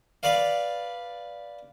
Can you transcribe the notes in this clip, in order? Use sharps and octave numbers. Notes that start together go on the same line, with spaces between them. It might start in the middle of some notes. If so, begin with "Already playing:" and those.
B4 D5 F5